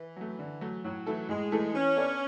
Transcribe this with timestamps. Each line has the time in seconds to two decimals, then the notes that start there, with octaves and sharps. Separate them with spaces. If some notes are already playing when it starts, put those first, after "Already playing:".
Already playing: E3
0.16 F#3 A3
0.39 D3
0.61 F#3 A3
0.84 A2 F#3
1.06 E3 A3 E4 A4
1.29 A2 G#3
1.52 E3 A3 E4 A4
1.74 E3 C#4
1.97 B3 D4 A4 D5